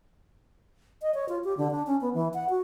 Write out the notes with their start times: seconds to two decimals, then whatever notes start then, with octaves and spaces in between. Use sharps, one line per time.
1.02 D#5
1.14 C#5
1.29 F4
1.44 G4
1.57 D3
1.71 D4
1.87 C#4
2.01 B3
2.14 E3
2.34 F#5
2.49 F#4